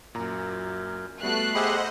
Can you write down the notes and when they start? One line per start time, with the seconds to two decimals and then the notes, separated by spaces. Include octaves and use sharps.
0.15 F#2 A#2 A#5
1.23 G3 A3 B3 F#4 F#6 C7
1.55 G4 G#4 C5 D#5 F#5 B5 E6